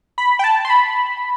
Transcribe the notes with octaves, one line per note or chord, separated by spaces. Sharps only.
B5
G5
A5
C6
B5